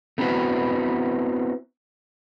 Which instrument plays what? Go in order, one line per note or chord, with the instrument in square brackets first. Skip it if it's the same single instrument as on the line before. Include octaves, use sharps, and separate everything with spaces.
[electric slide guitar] A3 B3 C4 E4 F#4 B4